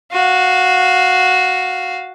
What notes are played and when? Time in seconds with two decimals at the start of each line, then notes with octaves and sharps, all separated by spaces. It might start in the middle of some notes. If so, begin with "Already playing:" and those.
0.12 F#4 F5